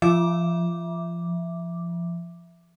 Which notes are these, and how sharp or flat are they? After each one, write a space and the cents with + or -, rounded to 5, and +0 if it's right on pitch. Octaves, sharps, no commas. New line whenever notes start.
F3 -25 E5 +0 D6 +0